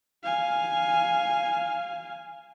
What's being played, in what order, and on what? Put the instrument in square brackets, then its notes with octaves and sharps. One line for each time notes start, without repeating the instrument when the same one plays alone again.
[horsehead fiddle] F5 G#5